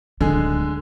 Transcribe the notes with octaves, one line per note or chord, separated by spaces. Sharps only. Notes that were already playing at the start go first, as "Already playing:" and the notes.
D1 D3 D#3 G#3 G#4